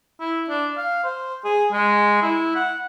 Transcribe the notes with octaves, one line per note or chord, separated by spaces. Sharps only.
E4
D4
F5
C5
G#4
G#3
E4
F#5